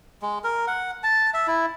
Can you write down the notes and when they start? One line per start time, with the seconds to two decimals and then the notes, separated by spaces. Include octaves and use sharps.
0.22 G#3
0.44 A#4
0.67 F#5
1.03 A5
1.34 E5
1.47 E4